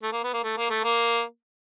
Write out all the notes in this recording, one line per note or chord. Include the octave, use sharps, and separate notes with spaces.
A3
A#3
B3
A#3
A3
A#3
A3
A#3